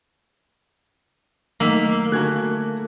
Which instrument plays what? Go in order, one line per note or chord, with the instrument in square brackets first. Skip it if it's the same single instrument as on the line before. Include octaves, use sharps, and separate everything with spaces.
[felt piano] D#3 [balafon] F#3 A3 D#4 [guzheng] A#3 [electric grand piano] A#5 E6 B6
[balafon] D3 G#5 [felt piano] A3 F#4 [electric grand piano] F#6 G#6